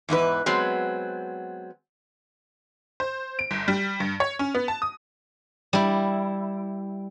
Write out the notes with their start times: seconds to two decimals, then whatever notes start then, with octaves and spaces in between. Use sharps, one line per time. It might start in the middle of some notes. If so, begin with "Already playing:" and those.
0.09 E2 G#2 E3 B4
0.46 F#3 G#3 B3 C4
3.00 C5
3.39 D7
3.51 G1
3.68 G3
4.00 G2
4.20 C#5
4.39 C#4
4.55 B3
4.68 A5
4.82 D#6
5.73 G3 E4